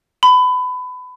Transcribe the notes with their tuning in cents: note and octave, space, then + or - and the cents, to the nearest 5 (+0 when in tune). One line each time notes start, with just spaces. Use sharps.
B5 +25